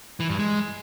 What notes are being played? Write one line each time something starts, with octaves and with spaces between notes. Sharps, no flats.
E3
G2
G#3